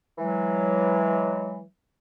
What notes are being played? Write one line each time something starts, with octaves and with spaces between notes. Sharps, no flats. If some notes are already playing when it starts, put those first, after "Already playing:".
E3 F#3 G#3